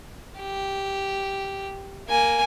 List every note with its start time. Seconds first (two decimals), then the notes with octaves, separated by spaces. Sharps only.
0.40 G4
2.08 A#3 G#5